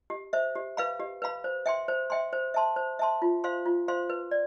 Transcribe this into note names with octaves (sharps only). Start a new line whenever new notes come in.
G4
C5 E5
G4
B4 F5 B5
G4
B4 F5 B5
C5
E5 G5 C6
C5
E5 G5 C6
C5
E5 A5 C6
C5
E5 A5 C6
F4
C5 F5 C6
F4
C5 F5 C6
B4
D5